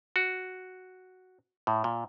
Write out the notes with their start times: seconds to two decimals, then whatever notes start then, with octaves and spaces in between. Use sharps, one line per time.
0.16 F#4
1.67 A2
1.84 A#2